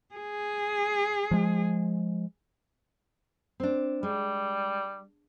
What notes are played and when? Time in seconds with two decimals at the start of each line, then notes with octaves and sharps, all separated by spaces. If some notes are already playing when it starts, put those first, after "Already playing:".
0.15 G#4
1.31 F3 G#3
3.60 C4 D4
4.03 G3 G#3